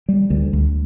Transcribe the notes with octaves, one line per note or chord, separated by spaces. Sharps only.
G3
D2
D2